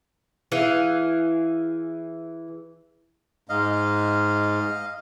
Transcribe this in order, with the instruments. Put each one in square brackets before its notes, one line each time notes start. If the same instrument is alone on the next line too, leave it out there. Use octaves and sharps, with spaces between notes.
[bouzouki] E3 G#4 F5
[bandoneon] G#2 [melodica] D#5 F5